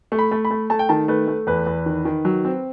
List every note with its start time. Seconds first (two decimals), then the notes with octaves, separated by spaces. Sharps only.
0.12 A3
0.19 B5
0.31 A3
0.45 B5
0.51 A3
0.70 A3 A5
0.79 G5
0.89 D#3 A5
1.08 A3 B4
1.28 A3
1.47 E2 B4
1.66 E2
1.86 D#3
2.05 D#3
2.25 F#3
2.45 C4